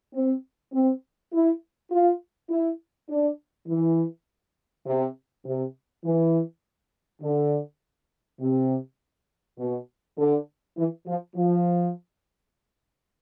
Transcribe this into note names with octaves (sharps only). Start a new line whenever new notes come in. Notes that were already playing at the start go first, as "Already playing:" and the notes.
C4
C4
E4
F4
E4
D4
E3
C3
C3
E3
D3
C3
B2
D3
E3
F3
F3